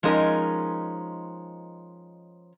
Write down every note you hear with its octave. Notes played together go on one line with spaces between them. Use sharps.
F3 G#3 C#4 D#4 A#4